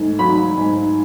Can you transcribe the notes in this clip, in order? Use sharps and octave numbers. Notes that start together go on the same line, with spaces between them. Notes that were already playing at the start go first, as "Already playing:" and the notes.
Already playing: G#2 A3
F#3 B5
G#2